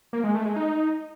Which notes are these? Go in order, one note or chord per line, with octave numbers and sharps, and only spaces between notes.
A#3
G#3
A3
G#3
D#4